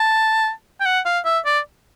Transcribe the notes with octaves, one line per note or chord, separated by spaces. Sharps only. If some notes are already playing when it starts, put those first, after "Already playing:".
Already playing: A5
G5
F#5
F5
E5
D5